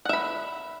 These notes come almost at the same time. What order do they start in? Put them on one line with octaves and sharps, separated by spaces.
F#5 E5 B5